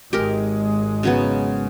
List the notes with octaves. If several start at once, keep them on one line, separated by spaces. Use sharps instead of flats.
G#1 G#3 G4 A#4
C#3 F#3 B3